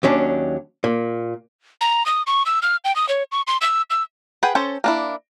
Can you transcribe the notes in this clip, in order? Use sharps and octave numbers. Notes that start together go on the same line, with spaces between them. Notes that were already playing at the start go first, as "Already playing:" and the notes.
D#2 F#3 C#4 D4
A#2
A#5
D#6
C#6
E6
F6
G5
D#6
C#5
C#6
C6
E6
E6
G#4 B4 F#5 G5
C#4 A4 C5
A#3 D4 E4